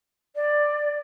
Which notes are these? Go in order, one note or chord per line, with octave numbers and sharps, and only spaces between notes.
D5